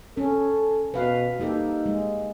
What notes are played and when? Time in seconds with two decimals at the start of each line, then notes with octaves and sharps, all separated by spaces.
0.17 C#4 A4
0.94 B2 B4 F5
1.40 A#3 D#4 G4 A4
1.86 G#3